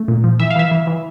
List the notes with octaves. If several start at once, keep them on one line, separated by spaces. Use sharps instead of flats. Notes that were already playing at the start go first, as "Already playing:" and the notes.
Already playing: A3
A#2
F3
E3 E5
F5
E3 E5
E3
E3